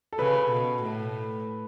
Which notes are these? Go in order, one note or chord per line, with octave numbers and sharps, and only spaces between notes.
A4
C#3 B4
B2
A2